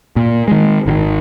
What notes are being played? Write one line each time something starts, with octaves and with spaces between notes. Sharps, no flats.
A#2
D#3 G#3
G#1 D3 D#3